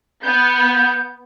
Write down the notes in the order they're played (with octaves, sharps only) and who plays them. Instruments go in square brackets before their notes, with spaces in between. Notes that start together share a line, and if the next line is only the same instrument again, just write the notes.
[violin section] B3 [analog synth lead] G6